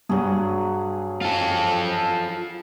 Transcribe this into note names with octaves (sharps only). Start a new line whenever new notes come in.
G2 F#3 G4 G#4
F4 A4